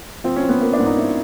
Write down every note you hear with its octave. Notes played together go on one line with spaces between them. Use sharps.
F3 C4
C#4
F3
B3
F3 A#3
D4
G#2
D#4
G#2 E4